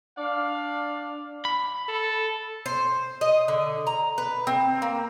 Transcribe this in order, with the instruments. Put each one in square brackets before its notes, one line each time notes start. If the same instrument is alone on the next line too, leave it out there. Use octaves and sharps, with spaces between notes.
[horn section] D4 D5 F5
[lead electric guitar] B5
[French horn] A4
[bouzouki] C5
D#5
D3
A#5
B4
C4
A#3